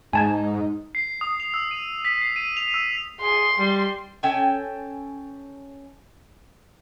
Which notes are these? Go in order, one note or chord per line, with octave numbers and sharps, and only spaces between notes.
G#2 D#4 G#5 A5 G#6
C7
D#6
F7
E6
D#7
B6
C7
D#7
F7
E6
G#4 C6
G3
C#4 A4 G5 G#5